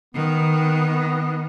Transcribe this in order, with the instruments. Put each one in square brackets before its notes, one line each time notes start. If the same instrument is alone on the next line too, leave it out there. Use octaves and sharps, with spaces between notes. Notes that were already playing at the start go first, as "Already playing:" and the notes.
[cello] D#3 [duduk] B3